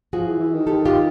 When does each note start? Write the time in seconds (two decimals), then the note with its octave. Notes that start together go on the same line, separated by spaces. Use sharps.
0.13 F3 F#4 G#4
0.27 E3
0.40 E3
0.53 D#3
0.67 G4 A4
0.85 F4 G4